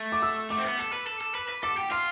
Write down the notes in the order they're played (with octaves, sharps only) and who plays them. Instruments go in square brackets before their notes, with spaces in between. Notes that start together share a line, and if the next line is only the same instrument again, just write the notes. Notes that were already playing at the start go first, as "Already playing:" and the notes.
Already playing: [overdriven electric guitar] A3
[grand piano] D6
E6
[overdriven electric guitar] A3 [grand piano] D6
[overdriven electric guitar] C4
B3
A4
B4
A4
A4
B4
B4
[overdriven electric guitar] A4 [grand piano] D6
[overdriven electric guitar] G4
[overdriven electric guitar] F4 [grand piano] C6